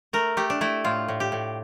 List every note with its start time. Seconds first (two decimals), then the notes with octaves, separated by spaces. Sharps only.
0.13 A3 A#4
0.37 A3 G4
0.50 D4
0.61 A3 E4
0.85 A2 F4
1.08 A2
1.20 G4
1.32 A2